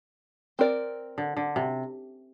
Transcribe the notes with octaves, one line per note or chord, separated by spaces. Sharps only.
C4 A#4 D5
D3
D3
C3